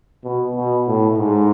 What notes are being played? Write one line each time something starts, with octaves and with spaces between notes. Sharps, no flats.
B2
B2
A2
G#2